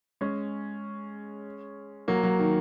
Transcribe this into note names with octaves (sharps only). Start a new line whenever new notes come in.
G#3 C#4
F#3 A#3
F#3
D#3